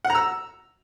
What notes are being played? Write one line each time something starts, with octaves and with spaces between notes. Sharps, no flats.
F#5
A#5
E6